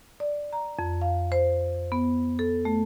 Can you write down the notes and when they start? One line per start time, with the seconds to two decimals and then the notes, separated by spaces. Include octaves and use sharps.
0.20 D5
0.53 A#5
0.79 F2
1.02 F5
1.32 C5
1.92 B3
2.39 A4
2.65 A3